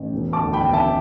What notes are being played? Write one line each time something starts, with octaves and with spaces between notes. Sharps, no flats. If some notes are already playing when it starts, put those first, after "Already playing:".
Already playing: A1
E1
A5 D6
D2
G5 B5
E1
E5 A5